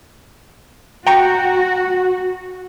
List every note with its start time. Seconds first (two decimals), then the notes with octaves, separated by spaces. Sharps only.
1.07 F#4 G5 A#5 C#6